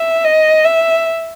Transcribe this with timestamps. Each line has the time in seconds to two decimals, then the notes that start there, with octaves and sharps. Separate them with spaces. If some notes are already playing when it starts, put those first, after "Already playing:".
Already playing: E5
0.24 D#5
0.65 E5